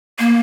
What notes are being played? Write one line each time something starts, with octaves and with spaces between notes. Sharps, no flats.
A#3